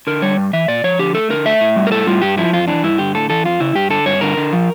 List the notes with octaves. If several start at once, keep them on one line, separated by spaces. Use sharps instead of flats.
D3 A#4
G3 C#5
G2
E3 E5
A#2 D5
F3 C#5
D3 G4
A3 A4
D3 A#4
A3 E5
A2
G3
A#4
A2 A4
G3 F4
G2 G4
F3 E4
F2 F4
E3 D4
G2 E4
D3 G4
A2 A4
E3 A4
F2 F4
C#3 E4
G2 G4
D3 A4
G2 C#5
D3 A#4
D3
F3